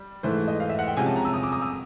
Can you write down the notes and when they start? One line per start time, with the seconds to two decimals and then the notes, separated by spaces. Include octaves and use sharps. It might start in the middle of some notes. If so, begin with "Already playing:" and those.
Already playing: G3
0.23 G#2 E3 A3 C5
0.48 D#5
0.60 F5
0.69 E5
0.79 F#5
0.88 G5
0.97 C3 F3 G#3 C#4 G#5
1.06 A5
1.16 A#5
1.25 E6
1.34 D#6
1.43 D6
1.52 D#6
1.62 E6